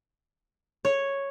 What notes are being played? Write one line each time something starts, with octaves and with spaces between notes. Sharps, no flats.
C#5